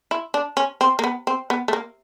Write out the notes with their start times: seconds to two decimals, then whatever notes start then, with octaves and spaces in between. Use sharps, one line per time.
0.11 E4
0.34 D4
0.57 C#4
0.81 C4
0.99 A#3
1.04 B3
1.27 C4
1.50 B3
1.68 A3
1.73 A#3